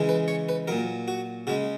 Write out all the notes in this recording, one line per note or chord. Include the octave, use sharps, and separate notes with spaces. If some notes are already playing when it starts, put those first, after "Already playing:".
Already playing: C#3 E3 G#3
B4
C#5
B4
A#2 F#3 A#4
F#4
C#3 G#3 F#4